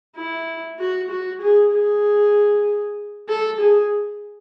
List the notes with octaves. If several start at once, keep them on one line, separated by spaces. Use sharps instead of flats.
E4
F#4
F#4
G#4
G#4
A4
G#4